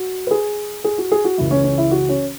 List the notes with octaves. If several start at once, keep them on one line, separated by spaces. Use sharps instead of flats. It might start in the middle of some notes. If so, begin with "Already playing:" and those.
Already playing: F#4
B4
G#4
G#4
F#4
G#4
F#4
C#2 C#3 E3 E4
C#4
C#4
E4
F#4
C#4